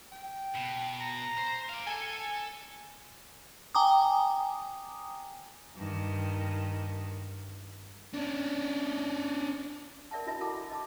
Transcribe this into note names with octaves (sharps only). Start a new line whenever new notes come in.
G5
B2
A#5
C5
D5 F5
A4 G#5
G5 G#5 A#5 D6 D#6
G2 D#3
C#4 D4
A#4 D5 E5 F#5 A5
D4 E4 F#4 D#5 E5 A5
E4 F#4 A4 F#5 A5 D6
D#5 A5 D6